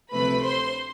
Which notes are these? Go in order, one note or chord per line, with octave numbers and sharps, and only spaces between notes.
D2 C3 F3 A3 B4 B5
C5 C6